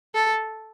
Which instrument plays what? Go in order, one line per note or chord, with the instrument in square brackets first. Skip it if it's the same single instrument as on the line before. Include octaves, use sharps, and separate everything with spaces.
[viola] A4